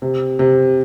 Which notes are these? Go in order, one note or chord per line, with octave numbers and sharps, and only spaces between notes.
C3
C3